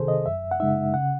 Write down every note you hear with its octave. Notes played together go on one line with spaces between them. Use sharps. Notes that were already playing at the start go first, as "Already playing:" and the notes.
Already playing: C2 C3 D#3 G#4 A4 C5
D#5
F#2 E5
F#5
C#3 G#3 D#4 E5
C#3 F#5